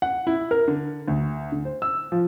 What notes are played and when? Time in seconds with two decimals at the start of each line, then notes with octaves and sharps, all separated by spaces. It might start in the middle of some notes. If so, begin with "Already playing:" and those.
0.02 F#5
0.27 E4
0.51 A#4
0.68 D3
1.08 D2
1.52 D3
1.65 C5
1.82 E6
2.12 F3